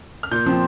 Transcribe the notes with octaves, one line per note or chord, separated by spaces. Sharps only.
F6
A#2 G6
F3 C4